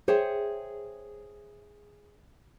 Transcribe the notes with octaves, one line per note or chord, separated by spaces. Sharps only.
G#4 C5 C#5 E5 G5